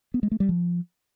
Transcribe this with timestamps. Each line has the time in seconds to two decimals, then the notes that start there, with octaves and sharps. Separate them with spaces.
0.14 B3
0.23 G#3
0.32 A3
0.40 G3
0.49 F3